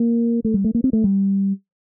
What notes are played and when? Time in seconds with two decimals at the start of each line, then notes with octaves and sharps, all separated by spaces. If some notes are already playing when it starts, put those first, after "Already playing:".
Already playing: A#3
0.44 A3
0.54 G3
0.64 A3
0.75 A#3
0.84 C4
0.93 A3
1.04 G3